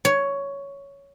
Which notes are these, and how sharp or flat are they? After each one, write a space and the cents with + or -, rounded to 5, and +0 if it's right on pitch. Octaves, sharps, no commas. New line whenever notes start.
C#5 +10